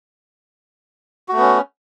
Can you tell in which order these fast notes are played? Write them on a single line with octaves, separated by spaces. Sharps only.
F#4 A3 B3 C#4